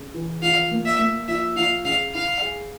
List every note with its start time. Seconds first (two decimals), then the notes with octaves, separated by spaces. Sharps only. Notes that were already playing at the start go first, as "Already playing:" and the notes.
Already playing: C#3
0.14 E3
0.42 F3 F5
0.71 A#3
0.85 E5
0.99 A#3
1.28 F3 E5
1.56 F3 F5
1.85 C#3 F5
2.14 E4 F5
2.42 G#4